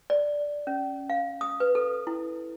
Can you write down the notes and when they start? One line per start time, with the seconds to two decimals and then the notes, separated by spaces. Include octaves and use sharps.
0.10 D5
0.67 C#4
1.10 F5
1.41 D#6
1.60 B4
1.75 A4
2.07 E4